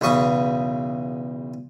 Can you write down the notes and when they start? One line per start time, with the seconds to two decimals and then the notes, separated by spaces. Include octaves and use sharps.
0.01 B1 E2 C#3 C#6 D#6